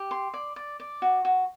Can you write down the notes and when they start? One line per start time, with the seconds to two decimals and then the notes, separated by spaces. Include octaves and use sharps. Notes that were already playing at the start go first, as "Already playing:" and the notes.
Already playing: G4
0.11 C6
0.34 D5
0.56 D5
0.80 D5
1.02 F#4
1.25 F#4